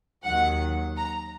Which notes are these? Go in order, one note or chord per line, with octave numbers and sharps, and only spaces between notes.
D#2 D#3 F#3 F#5
A#5